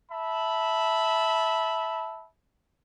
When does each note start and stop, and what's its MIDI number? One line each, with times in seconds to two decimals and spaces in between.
0.11 2.26 76
0.11 2.26 81
0.11 2.26 83